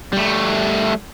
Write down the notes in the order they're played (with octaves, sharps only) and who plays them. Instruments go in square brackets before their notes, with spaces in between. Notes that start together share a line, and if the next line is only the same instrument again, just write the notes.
[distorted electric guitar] G3 A3